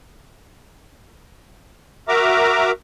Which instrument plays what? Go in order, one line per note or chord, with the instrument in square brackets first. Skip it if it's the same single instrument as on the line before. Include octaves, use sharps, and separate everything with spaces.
[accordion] F#4 A#4 E5 A#5 D6